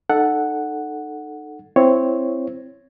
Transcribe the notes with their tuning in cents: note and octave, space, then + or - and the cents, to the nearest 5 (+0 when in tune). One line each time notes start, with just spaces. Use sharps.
D#4 -30 A4 +0 F#5 +0
C4 +0 E4 +20 C#5 +0